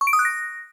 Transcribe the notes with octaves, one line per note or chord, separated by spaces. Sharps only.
C#6
D7
D#6
F#6
A#6